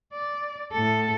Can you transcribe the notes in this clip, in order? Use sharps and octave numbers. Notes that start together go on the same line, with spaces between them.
D5
A2 A4